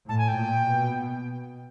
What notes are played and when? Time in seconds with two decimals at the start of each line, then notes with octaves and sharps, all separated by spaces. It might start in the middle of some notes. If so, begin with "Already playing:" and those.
0.08 A2 A5
0.18 G#5
0.28 G5
0.38 A#2
0.69 B2